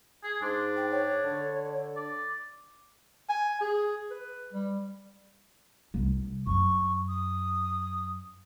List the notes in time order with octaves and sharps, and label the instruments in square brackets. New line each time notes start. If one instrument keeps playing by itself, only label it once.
[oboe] G#4
[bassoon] G#2 [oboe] D4 [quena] C6
[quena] G5
C#5
[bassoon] D3
[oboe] D5
[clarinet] G#5
G#4
B4
G3
[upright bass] C2
[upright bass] F#2 [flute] C#6
[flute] D#6